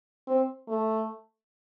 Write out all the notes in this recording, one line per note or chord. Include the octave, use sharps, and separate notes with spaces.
C4
A3